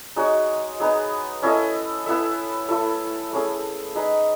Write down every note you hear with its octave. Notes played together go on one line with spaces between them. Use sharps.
G#3 D#4 F#4 C#5
B3 D#4 G#4
C#4 E4 A4 D#5
B3 E4 A4 E5
A3 E4 A4
A3 C#4 G#4
D#4 G#4 B4 D#5